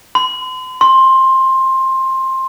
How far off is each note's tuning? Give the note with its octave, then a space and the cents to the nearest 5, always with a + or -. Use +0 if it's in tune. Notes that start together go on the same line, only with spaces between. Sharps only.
C6 -45
C6 +15